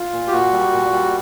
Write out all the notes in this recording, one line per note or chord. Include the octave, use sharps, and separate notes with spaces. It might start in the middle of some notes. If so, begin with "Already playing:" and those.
Already playing: F4
A#2
G4
A#2 F#4
G3
A#2
G3